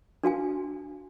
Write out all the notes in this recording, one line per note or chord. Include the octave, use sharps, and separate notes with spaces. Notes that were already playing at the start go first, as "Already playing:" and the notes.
D4 F#4 F5 G#5